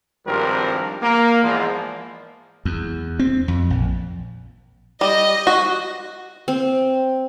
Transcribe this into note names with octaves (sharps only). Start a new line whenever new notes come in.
G#1 G2 F3 C4 G4 A#4
A#3
E2 G#2 F3
E2
C4
F2
A#1
G3 D#5
F#4
C4